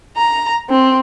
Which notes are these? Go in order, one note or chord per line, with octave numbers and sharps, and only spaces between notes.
A#5
C4